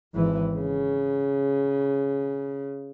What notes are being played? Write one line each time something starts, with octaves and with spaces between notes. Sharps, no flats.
G#1 E3
C#3